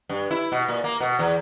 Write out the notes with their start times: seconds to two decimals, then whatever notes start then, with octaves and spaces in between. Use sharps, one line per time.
0.09 G2
0.31 E4
0.52 B2
0.68 A#2
0.84 A#3
1.00 B2
1.19 E2